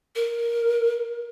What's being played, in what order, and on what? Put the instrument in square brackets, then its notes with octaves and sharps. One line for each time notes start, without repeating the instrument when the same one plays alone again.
[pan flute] A#4